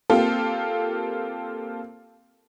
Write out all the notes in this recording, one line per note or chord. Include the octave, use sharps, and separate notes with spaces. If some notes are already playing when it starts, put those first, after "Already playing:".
A#3 C4 F4 G4 A4